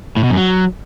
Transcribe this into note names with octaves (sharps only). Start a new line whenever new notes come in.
A2
B2
F#2
F#3